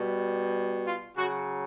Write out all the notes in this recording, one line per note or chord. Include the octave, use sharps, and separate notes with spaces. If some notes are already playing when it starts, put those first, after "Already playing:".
Already playing: B2 G3
F4
C#3 F#3 F#4